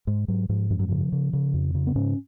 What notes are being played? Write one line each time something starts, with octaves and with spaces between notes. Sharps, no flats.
G#2 G#3
G#2 F#3
G#2 F3
F#2 F3
F#3
C#3 F3
C#3
C#3
F2
C#3
B3
G#2 C#4